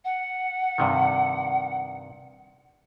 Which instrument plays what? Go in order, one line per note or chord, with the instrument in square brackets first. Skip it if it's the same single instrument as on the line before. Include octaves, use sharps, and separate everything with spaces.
[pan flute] F#5
[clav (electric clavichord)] G2 C3 D#3